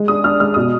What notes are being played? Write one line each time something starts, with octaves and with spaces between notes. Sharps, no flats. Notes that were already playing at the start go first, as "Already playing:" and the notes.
Already playing: G#3
D4 D#6
D4 F6
G#3 F6
B2 D#6